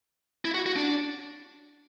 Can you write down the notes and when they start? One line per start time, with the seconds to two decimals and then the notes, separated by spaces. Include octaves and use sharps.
0.45 E4
0.54 F#4
0.66 F#4
0.76 D4